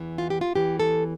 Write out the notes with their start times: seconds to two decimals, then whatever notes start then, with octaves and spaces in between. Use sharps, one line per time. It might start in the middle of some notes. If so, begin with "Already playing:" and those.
Already playing: E2 E3
0.18 F4
0.30 G4
0.41 F4
0.55 E2 E3 G4
0.80 A4